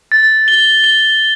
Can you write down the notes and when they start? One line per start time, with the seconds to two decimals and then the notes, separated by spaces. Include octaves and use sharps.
0.12 A6
0.48 G7
0.84 G7